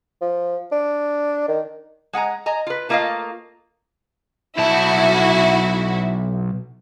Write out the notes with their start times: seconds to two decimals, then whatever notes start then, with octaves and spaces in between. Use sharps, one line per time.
0.21 F3
0.72 D4
1.48 D#3
2.13 G#3 F#5 G#5 A#5
2.46 D#5 G#5 A#5
2.67 F4 B4
2.89 A3 A#3 F4 A4 D#5 F5
4.58 B1 E4 F#4 A5